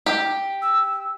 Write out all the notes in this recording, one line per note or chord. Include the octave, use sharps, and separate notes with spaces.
G4
E6